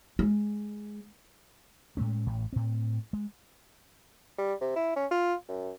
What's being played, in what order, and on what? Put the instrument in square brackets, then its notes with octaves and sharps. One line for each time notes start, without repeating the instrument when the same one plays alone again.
[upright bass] G#3
[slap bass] A2 G#3 A3 C#4
A1 A2
A2 C4
G#3
[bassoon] G3
C3
E4
C#4
F4
F#2